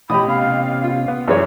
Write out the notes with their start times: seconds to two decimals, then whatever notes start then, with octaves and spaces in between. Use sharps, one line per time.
0.10 A1 B2 G4 D#5 B5 D#6
0.28 C3 B3 C#4 F5
0.84 F4
1.08 B3
1.28 F#2 E3 G#3 C#5